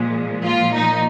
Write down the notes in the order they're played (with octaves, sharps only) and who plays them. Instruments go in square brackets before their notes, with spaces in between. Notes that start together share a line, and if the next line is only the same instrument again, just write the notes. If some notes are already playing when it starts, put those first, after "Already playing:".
Already playing: [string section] A#2 F3 G#3
F4
D#4